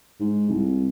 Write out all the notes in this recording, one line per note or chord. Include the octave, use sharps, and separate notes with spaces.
G#2
C2